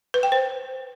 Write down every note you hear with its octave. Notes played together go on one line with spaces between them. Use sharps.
B4
G5
C5